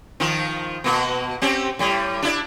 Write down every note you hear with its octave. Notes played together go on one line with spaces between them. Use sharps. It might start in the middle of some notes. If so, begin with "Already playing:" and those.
D#3 F3 F4
B2 A#3 F#4
C4 C#4 G4
A2 G3
D4 E4 D5